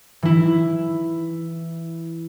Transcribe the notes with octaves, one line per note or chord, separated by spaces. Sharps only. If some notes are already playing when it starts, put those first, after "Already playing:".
E3 E4